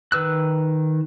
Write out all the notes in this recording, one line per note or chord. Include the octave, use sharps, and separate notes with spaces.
D#3 B4 E6 F#6